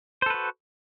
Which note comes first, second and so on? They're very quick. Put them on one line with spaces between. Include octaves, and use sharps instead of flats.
C5 A4 B4 F#4